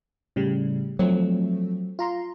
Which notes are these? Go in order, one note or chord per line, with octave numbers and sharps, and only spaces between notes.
A2 C#3 G3
F3 F#3 A3 C4
F4 A#5 C6